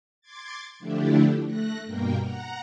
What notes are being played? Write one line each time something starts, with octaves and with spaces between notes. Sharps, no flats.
C6 D6 G#6 A6
D3 F3 A3 D4 E4 G4
A3 F#6 A#6
G2 B2 A#3 A#4 G5
F#5 A#5